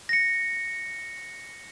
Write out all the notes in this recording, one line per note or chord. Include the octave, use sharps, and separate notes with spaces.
A#6 C#7